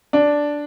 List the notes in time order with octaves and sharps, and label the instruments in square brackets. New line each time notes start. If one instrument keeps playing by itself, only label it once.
[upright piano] D4